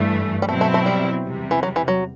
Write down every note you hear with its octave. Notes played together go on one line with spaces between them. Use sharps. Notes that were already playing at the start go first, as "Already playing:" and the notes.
Already playing: G2 E3 A3
G3
B2 F#3 A3 C4 E4
A3
A3
G3
E2 C3 G3
E3
F#3
E3
F#3